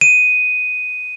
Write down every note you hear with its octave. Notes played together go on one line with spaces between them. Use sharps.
D#7